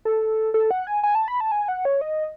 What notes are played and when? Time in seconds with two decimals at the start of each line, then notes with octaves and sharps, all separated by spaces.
0.05 A4
0.54 A4
0.71 F#5
0.87 G#5
1.03 G#5
1.15 A5
1.28 B5
1.40 A5
1.52 G#5
1.68 F#5
1.85 C#5
2.01 D#5